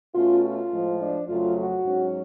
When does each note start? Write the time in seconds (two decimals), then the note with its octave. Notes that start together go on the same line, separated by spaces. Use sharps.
0.15 B2 A3 C#4 F4
0.44 F4
0.72 A2 F3 G#3
1.00 D4
1.28 F2 C#3 F#3 A3 F4
1.57 F#4
1.85 G#2 F#3 C#4